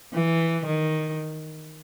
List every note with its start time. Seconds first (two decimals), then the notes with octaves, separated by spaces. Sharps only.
0.14 E3
0.66 D#3